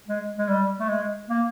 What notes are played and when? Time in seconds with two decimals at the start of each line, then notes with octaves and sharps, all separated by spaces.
0.08 G#3
0.38 G#3
0.48 G3
0.80 A3
0.89 G#3
1.29 A#3